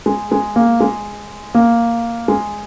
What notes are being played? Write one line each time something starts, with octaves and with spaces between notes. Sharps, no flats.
G#3
G#3
A#3
G#3
A#3
G#3